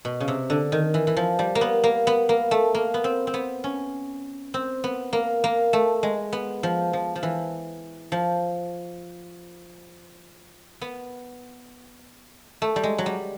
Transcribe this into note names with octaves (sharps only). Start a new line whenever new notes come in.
B2
C#3
C3
D3
D#3
E3
E3
F3
G3
A#3
B3
A#3
B3
A#3
A3
A#3
B3
C4
C4
B3
C#4
C4
B3
A#3
A#3
A3
G#3
B3
F3
F3
F3
E3
F3
B3
A3
G3
G#3
F#3
G3